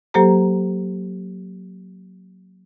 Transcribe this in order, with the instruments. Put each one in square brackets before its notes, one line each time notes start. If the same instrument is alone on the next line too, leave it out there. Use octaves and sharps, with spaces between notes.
[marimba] F#3 A#3 G4 A4 C5 A#5